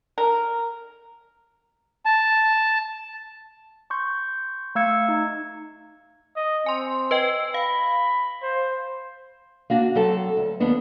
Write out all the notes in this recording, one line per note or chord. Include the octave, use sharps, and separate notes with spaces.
A#4
A5
C6 C#6 G6
A3 F5 E6 G#6 C#7
D#4
D#5
C4 G#5 C6
B4 D#5 G5
F5 B5
C5
A#3 D4 F#4
F#3 C4 A4 A5
D2
D#2 B3 D4